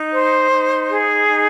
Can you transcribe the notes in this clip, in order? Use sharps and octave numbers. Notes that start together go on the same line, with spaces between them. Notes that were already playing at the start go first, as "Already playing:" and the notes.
Already playing: D#4
C5
D#4
G#4
D#4